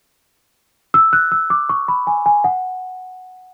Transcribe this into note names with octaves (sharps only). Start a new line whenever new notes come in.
E6
F#6
E6
D6
C#6
B5
G#5
G#5
F#5